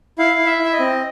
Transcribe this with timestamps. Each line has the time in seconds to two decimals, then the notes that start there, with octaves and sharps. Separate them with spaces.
0.18 E4 F5
0.39 E4
0.46 E5
0.59 E4
0.64 E5
0.73 D#5
0.80 C4